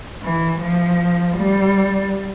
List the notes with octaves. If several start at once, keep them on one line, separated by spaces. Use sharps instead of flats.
E3
F3
G3